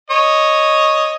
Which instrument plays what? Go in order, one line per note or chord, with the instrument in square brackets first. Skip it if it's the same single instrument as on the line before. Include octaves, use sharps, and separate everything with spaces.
[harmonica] C#5 D#5